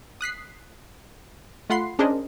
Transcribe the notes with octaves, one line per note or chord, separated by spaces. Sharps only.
D#6 F#6 B6 C7
A3 F4 F#5 B5 C6 C7
C#4 D4 G#4 A#4 C5 D#5